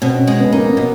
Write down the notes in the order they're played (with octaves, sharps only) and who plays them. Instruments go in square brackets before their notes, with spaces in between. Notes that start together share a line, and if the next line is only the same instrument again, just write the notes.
[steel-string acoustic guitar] B2 [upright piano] C4
[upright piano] C#4
[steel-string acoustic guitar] G#3
[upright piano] B3
[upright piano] A#3 [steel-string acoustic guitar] D#4
[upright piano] A#3
[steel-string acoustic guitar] B2